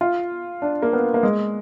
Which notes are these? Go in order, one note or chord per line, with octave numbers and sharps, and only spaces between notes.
F4
D4
A#3
B3
A#3
G#3